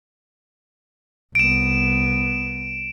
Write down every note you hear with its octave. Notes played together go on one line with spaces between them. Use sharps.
C2 B3 D7 E7